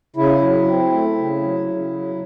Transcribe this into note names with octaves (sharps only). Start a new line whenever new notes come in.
C#3 E4
F#3
C4
A3
C#3
F#3
C#3
F#3